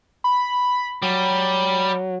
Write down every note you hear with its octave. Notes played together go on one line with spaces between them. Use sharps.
B5
F#3 G3